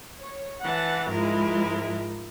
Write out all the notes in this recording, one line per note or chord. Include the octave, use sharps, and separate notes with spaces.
C#5
E3 F#5 A5
G#2 F3 G#3 E4 A#4